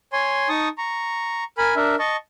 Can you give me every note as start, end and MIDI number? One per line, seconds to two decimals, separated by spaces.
0.13 0.48 73
0.13 0.48 80
0.13 0.48 84
0.49 0.69 63
0.49 0.69 81
0.49 0.69 85
0.49 0.69 87
0.78 1.44 82
0.78 1.44 85
1.58 1.75 70
1.58 1.75 80
1.58 1.75 83
1.76 1.96 62
1.76 1.96 70
1.76 1.96 76
1.99 2.16 75
1.99 2.16 81
1.99 2.16 85